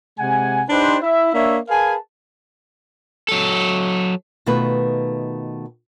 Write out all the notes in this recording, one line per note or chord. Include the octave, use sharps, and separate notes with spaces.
C3 G#3 F#5 G#5
D4 D#4 G4 B4 C5
E4 E5
A#3 D4 C#5 E5
G#4 A#4 B4 F5 G#5 A5
F#3 A4
B2 D#3 A3 F4 B4